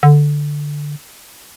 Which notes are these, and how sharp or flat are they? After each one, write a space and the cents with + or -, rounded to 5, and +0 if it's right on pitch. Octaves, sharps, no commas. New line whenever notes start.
D3 +0